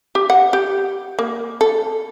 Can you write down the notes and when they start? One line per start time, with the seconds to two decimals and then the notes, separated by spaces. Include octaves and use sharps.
0.15 G4
0.30 F#5
0.53 G4
1.19 A#3
1.61 A4